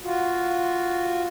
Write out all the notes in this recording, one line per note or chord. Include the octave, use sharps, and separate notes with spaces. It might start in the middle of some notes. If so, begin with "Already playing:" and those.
F4 F#4